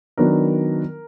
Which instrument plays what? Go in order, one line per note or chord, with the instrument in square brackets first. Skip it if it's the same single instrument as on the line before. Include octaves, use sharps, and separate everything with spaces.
[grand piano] D#3 F#3 B3 D4 A#4